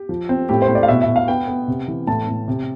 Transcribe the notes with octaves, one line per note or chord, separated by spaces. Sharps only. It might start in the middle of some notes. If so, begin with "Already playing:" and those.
Already playing: G4
F3
C4
A2 G4
C5
A2
D5
F5
B2 E5
E5
B2
F5
B3 G5
B3
C3
E3
A2 A5
A2
C3